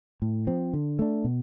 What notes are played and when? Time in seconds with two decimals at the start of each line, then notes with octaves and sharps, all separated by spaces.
0.22 A2
0.47 F3 C4
0.74 D3
0.99 A3 D4
1.24 B2